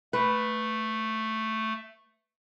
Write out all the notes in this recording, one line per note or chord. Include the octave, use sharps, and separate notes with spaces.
A3 B4